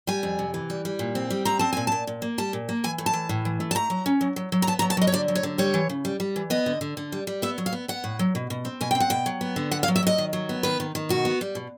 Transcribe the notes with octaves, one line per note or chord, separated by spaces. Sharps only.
G3 G#5
F2
C3
E3
G3
G3
A#2
C4
G3
C4 A#5
C4 A5
A#2 G#5
A#2 A5
A#2
A#3
G3 A5
A#2
A#3
E3 G#5
A2
A5
E3
A2
E3
A3
A5
A3 A#5
F#3
C#4
F#3
F#3
F#3
A#5
B3 A5
A#5
F#3
A5
F#3 D#5
C#5
D3 D5
F#3
C#5
D3
G3 C#5
E3
C#3
G3
G3
E3
B3 D#5
D3
D3
D3
G3
G3
B3 E5
F#3
F5
B3
B3 F#5
A2
F#3
B2
B2
C4
B2 G#5
C4 G5
F#5
B2 G5
F#3
B3
D3
B3 F#5
F5
F#3
E5
F#3 D#5
D#3
F#3
B3
D#3 B4
D#3
D#3
B2 F#4
B3
G3
B2